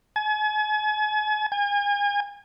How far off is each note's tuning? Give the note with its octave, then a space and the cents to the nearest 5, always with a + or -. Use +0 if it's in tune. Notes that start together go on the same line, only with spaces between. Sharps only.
G#5 +40
G#5 -35